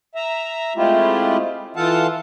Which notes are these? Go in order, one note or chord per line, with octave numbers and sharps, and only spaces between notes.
E5 A#5
G#3 A3 C4 E4 F4 G4
E3 F4 A4 F5 F#5 A5